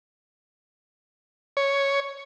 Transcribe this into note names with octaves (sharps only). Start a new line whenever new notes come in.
C#5